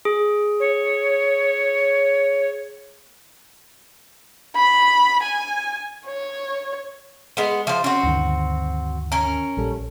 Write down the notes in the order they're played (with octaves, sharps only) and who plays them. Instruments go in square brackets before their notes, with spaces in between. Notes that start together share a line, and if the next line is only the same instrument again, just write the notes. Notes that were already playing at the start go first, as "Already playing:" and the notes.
[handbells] G#4
[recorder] C#5
[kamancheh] B5
G#5
C#5
[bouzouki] G#3 B3
[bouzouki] F3 C5 [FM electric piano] E5
[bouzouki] C4 F#4 [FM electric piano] C#4
[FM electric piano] D2 G2 D#3
[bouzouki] C#4 A#4
[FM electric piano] A#1 G3 A4